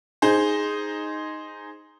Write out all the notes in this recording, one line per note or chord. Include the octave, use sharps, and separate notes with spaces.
D#4 G#4 C5